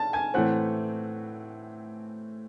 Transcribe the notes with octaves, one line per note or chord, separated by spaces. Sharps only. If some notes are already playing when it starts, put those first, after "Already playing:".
Already playing: A5 A6
G#5 G#6
A2 E3 A3 C4 F#5 F#6